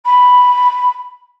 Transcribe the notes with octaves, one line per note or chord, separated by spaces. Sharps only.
B5